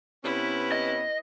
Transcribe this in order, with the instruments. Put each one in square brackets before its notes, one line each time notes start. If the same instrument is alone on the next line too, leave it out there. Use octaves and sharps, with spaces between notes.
[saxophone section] C3 B3 C#4 [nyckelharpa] E4 B4
[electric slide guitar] D#5